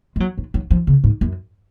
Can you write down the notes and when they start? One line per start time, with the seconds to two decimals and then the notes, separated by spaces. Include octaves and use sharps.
0.16 G#3
0.20 F#3
0.38 F#3
0.54 F#3
0.71 F3
0.87 C#3
1.04 G#2
1.21 F#2